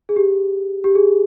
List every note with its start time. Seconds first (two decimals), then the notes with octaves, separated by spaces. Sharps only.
0.09 G#4
0.16 G4
0.84 G4
0.95 G#4